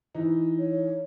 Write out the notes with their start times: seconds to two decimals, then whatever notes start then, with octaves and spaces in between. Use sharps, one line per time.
0.15 E3 D#4
0.59 C#5